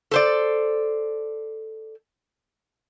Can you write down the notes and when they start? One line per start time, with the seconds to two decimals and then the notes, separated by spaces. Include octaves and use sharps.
0.11 A4 C5 D5